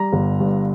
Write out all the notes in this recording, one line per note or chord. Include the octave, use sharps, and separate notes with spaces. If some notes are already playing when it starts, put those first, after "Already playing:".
Already playing: G3 A#5
G1
G2